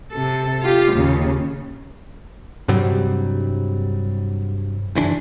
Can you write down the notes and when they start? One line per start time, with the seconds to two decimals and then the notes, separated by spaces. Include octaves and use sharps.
0.12 C3 A4
0.62 F4 G4
0.92 D#2 C#3
2.68 G2 C3 F#3 G3
4.95 F#1 E3 C4 D4